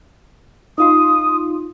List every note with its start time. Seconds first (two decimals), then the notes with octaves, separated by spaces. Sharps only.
0.78 D#4 F4 C6 D#6